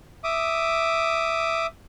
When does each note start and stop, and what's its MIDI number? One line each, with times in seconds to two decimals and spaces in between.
0.24 1.67 76
0.24 1.67 86
0.24 1.67 87